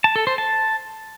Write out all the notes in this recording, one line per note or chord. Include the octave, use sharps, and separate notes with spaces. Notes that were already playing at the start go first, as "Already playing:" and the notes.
A5
A4
C5
A5